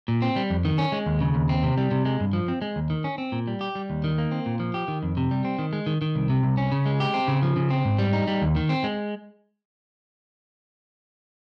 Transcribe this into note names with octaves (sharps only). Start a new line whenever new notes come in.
A#2
C4
G3
F2
D#3
C#4
G#3
D#2
C#3
D#2
C4
C3
G3
C3
G#3
G2
F3
C4
G#3
D#2
D#3
C#4
C4
A#2
G3
G4
G3
D#2
D#3
A#3
C4
A#2
F3
G4
D#3
F2
C3
G3
C4
D#3
G#3
D#3
D#3
C2
C3
C2
C#4
C#3
G#3
G4
C4
C#3
F3
C#3
C4
G#2
G3
D#4
G3
D#2
D#3
C4
G#3